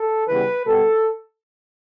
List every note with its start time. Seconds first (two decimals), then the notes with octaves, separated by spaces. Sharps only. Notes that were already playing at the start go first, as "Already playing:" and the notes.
Already playing: A4
0.27 C#3 E3 G3 B3 B4
0.65 B2 G3 B3 A4